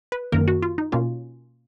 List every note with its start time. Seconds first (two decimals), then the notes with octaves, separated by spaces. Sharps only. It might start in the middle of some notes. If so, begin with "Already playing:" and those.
0.12 B4
0.32 F#2 D#3 A#3 A#4
0.48 F#4
0.62 F4
0.78 D#4
0.92 B2 A#3 C#4 F4